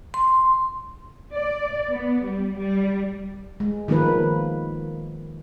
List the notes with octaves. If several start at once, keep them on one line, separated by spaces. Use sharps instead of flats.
C6
D5
B3
G3
G3
G#3
D#3 F3 A#3 D#4 B4